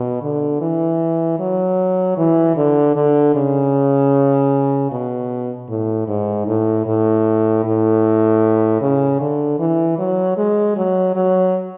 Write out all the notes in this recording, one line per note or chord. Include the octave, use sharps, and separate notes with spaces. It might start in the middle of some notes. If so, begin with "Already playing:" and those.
Already playing: B2
D3
E3
F#3
E3
D3
D3
C#3
B2
A2
G#2
A2
A2
A2
C#3
D3
E3
F#3
G#3
F#3
F#3